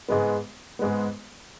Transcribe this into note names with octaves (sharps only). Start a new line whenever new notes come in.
G#2 G#3 B3
G#2 G#3 B3